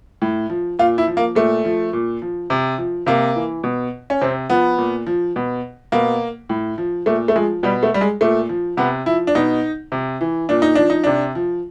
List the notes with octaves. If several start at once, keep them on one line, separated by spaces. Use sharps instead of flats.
A2
F3
A#2 F4
E4
F3
A#3
A#2 A3
F3
A#2
F3
C3
F3
C3 A#3
E3
B2
C#4
C3 C4
F3 B3
A#2
F3
B2
B2 A#3
A2
F3
A#2 A3
A3
F3 G#3
B2 G3
A3
G3
G#3
A#2 A3
F3
C3 B3
F3 E4
D4
B2 D#4
C3
E3
A#2 D4
D#4
F3 D4
D#4
C3 D4
F3